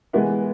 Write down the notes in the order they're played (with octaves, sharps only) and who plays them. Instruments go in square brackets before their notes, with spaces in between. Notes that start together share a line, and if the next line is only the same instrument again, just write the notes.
[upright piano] E3 G#3 B3 E4